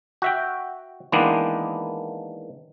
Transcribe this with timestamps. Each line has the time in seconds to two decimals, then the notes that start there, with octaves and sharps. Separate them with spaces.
0.22 F#4 E5 G5
1.12 D#3 E3 G#3 A#3 B3 D4